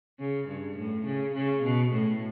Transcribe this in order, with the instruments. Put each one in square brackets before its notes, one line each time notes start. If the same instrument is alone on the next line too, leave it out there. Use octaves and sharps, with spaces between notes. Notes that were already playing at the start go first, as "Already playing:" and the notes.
[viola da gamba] C#3
G2
A2
C#3
C#3
B2
A2